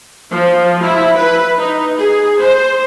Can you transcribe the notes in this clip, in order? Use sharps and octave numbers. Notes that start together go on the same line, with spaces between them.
F3
E4
B4
D#4
G#4
C5